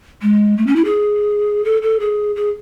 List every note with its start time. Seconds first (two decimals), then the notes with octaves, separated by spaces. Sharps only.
0.22 G#3
0.57 A3
0.66 C#4
0.75 E4
0.84 G#4
1.64 A4
1.82 A4
1.99 G#4
2.35 G#4